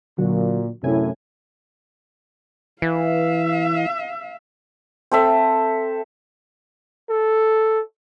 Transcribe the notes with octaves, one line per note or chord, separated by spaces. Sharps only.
A#2 D3 F#3 F#4
F#2 A2 C3 E4 G#5
E3 E5 F5
C4 A4 E5
A4